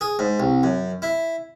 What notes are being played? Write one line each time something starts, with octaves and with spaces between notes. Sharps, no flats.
G#4
G#2
C2
F#2
E4